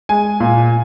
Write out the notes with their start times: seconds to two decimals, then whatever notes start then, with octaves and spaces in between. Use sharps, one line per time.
0.09 G#3 G#5
0.40 A#2